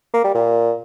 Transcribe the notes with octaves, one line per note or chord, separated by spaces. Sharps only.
A#3
G3
A#2